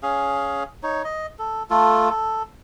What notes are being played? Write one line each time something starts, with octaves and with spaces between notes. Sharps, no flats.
C#4 G#4 F5
D#4 C#5
D#5
A4
A3 F4 A4
A4